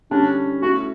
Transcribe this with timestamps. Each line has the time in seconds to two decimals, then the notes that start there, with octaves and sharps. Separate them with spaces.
0.11 D3 G3 C#4 D4
0.62 A3 C#4 E4 F#4